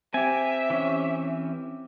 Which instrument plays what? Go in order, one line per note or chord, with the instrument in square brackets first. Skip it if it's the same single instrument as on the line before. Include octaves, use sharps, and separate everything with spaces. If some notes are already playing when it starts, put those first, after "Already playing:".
[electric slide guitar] C4 G4 [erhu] E5 [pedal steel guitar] G#5
[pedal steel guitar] E3 C#4